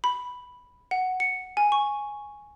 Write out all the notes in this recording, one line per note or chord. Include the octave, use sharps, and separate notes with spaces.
B5
F#5
C#7
G#5
C#6